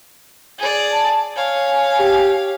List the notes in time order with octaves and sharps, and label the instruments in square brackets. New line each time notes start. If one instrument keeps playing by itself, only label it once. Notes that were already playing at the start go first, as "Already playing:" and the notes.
[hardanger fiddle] G#4 D5
[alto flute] A5
[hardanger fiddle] C#5 F5 [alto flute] G#5
[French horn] G4